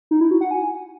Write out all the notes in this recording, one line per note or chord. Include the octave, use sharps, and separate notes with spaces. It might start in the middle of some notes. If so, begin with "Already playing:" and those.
D#4
E4
F#4
F#5
G#5